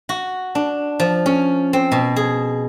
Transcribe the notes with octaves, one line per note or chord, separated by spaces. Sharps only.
F#4
D4
F3
C#4
C4
B2
G#4